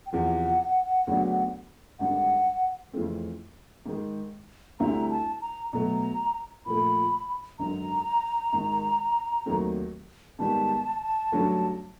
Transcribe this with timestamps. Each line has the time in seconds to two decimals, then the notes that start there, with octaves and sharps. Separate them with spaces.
0.06 G5
0.13 E2 C3 F3 F#5
1.07 D2 C#3 F#3 B3 D4
1.99 G#1 G2 D3 F#5
2.93 F2 C#3 E3 A3 C4
3.86 G#2 D#3 G#3
4.80 D2 D3 G3 C4 E4 A#5
5.10 A5
5.41 A#5
5.73 B2 F#3 A3 A#5
6.66 A#2 F3 A3 B5
7.59 G#1 F#2 D3 A#5
8.52 G#1 G#2 D#3
9.46 D#2 D#3 F#3 A3 C4
10.39 G#2 D#3 G3 B3 A5
11.32 G2 D3 F#3 A3 C#4